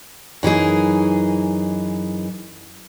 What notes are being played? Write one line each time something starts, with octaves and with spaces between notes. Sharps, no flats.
F#2 E3 D#4 G#4